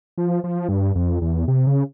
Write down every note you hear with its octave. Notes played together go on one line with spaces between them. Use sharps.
F3
F3
G2
F2
E2
C3
C#3